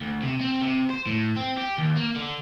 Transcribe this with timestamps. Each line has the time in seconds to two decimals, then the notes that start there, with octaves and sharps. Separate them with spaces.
0.01 D2
0.22 C3
0.41 C4
0.61 C3
0.90 C5
1.06 A2
1.36 C4
1.57 G4
1.78 D#2
1.96 A#3
2.16 D3